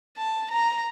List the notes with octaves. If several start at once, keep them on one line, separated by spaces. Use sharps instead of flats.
A5
A#5